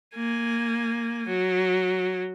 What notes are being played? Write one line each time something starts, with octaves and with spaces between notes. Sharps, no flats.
A#3 G#5
F#3